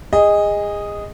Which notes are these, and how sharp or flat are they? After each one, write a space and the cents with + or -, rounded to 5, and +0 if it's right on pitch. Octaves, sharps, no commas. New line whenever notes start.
G#4 -25 D#5 +0